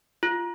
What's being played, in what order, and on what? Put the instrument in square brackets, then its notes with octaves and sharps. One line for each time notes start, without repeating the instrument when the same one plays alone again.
[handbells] F4